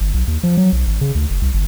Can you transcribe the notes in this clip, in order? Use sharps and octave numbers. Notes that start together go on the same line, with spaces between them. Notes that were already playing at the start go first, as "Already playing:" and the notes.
G1
B1
D#2
F3
F#3
B1
G#1
C#3
D2
F#1
C2
G1